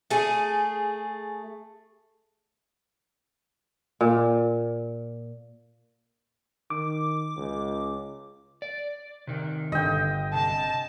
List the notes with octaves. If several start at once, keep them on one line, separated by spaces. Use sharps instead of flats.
A3 G#4
A#2
D#3 D6
C#2
D5
C3 D#3
G1 D3 D#5 G5
C3 A5